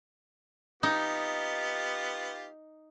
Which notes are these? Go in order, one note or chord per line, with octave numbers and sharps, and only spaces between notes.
B3 D#4 F4 G4